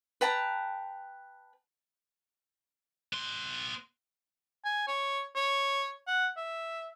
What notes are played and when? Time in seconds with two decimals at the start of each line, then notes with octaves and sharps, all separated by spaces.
0.21 B4 G5 A5 A#5
3.13 B3 C6
4.65 G#5
4.88 C#5
5.36 C#5
6.08 F#5
6.37 E5